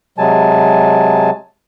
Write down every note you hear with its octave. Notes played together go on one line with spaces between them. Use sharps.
C3 F#3 G#3 G#5 A5